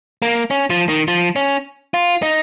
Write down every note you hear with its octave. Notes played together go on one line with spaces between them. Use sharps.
A#3
C#4
F3
D#3
F3
C#4
F4
D#4